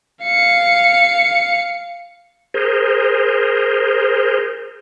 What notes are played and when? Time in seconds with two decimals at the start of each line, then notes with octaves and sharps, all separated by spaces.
0.23 F5 C#7
2.54 G#4 A#4 C5